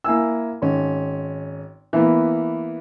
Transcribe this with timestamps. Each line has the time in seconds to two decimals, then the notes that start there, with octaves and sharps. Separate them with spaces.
0.04 A#3 E4 G#5 E6
0.62 G#1 C#4
1.93 E3 A#3 B3